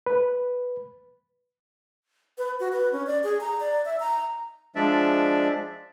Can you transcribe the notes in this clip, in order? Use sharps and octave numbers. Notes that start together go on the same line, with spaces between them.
B4
B4
F#4
B4
C#4
D5
G#4
A#5
D5
E5
A#5
F3 G#3 D4 D5 E5